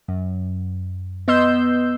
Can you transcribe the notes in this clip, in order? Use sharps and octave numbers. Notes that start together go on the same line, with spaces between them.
F#2
B3 D#5 C6 E6 G6